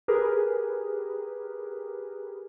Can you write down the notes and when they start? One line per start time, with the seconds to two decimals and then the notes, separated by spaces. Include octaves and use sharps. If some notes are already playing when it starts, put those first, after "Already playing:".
0.08 G4 G#4 A#4 B4